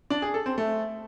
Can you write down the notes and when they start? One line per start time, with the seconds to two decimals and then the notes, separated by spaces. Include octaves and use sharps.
0.10 D4
0.22 G#4
0.34 A4
0.46 C4
0.58 A3